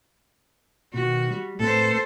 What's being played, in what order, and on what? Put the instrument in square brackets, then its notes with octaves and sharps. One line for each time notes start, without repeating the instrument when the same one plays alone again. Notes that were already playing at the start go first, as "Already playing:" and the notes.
[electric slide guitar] B2 D#3 [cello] F#4
[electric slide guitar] G3
[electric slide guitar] A2 C4 B4 [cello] A4 C5